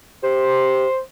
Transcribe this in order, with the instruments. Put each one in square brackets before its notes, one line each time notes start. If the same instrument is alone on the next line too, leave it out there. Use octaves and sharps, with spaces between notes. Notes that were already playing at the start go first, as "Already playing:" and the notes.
[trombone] G4 [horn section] C5